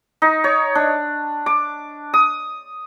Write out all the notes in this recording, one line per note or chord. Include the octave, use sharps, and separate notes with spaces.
D#4
C#5
D4
D6
D#6